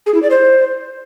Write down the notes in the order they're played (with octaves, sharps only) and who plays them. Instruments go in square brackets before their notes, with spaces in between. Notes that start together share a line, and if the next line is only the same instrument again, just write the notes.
[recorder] G#4
E4
D5
C5